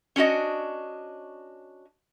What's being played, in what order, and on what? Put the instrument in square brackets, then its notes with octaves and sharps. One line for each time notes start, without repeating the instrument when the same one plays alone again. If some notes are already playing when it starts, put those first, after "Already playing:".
[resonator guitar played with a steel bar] C#4 D4 F#4 D#5